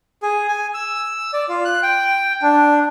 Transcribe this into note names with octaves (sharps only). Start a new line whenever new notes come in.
G#4
G#5
E6
D5
F4
F#6
G5
D4